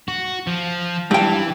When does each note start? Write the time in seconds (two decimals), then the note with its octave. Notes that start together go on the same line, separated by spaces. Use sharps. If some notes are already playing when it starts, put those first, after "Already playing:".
0.08 F#4
0.47 F3
1.11 G2 E3 G5